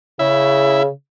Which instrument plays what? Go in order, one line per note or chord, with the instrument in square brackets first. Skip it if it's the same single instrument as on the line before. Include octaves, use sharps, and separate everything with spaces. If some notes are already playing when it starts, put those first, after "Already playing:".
[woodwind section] C#3 [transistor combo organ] E4 E5